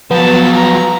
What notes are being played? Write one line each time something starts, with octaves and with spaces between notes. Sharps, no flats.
F3 F#3 B3 A5
A#5